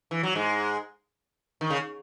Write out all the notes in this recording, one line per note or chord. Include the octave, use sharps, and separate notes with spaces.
E3
F#3
G#2 G#3
D#3
C#3